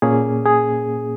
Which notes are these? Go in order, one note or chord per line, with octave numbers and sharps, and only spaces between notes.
A#2 A#3 C#4 G#4
G#4